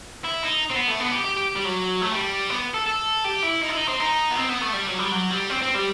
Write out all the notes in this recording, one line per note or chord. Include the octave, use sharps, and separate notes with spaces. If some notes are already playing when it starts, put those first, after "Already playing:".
E4
D#4
C4
B3
A3
B3
G4
G4
G4
G3
F#3
A3
G3
B3
A4
A4
G4
E4
D#4
E4
D#4
C4
D#4
B3
C4
B3
A3
G3
F#3
G3
F#3
G3
C4
C4
G3